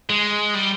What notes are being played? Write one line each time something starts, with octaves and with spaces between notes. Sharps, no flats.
G#3
G3